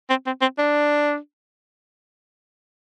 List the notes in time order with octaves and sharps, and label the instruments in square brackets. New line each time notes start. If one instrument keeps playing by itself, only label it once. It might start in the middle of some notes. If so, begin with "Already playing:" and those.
[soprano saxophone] C4
C4
C4
D4